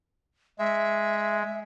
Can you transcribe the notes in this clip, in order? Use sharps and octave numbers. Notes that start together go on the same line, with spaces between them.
G#3 E5